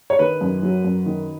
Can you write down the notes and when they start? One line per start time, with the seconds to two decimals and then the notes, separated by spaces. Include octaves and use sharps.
0.10 C#5
0.19 D#3 B4
0.41 F#2
0.63 F#3
0.84 F#2
1.06 D#3